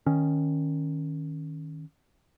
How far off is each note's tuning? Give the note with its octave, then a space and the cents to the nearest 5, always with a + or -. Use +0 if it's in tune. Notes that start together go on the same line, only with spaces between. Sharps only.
D#3 +0 C#4 +0